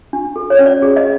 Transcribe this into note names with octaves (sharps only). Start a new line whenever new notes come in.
D4
A4
C#5
C#4
D5
G#4
D#5